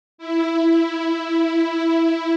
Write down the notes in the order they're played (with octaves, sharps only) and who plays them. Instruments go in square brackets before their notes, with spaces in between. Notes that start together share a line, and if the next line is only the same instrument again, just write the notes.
[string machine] E4
E4